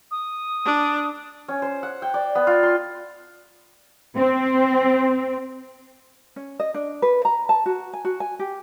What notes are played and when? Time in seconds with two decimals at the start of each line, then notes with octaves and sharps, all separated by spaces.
0.11 D#6
0.65 D4
1.48 C#4
1.62 C5
1.83 F#5
2.02 G5
2.14 D5
2.35 B3
2.47 F4
2.63 C6
4.17 C4
6.36 C#4
6.60 D#5
6.74 D4
7.02 B4
7.25 A#5
7.49 A5
7.66 F#4
7.93 G#5
8.05 F#4
8.20 G#5
8.39 G4